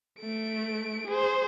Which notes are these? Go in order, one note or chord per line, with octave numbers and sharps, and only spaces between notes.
A3 D7
G#4 C5